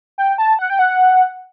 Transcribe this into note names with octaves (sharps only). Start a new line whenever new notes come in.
G5
A5
F#5
G5
F#5